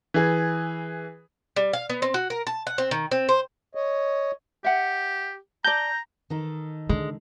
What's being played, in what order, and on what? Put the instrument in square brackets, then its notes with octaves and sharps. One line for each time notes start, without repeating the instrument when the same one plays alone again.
[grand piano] E3 G#4
[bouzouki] G3
F5
B3
C4
F#4
A#4
A5
F#5
C4
D#3
C4
C5
[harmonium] C#5 D#5
[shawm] G4 [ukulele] E5 F#5
[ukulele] D5 A5 [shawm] A#5 [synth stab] G6
[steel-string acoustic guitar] D#3 D#4 A4
[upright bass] D3 [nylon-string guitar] G#3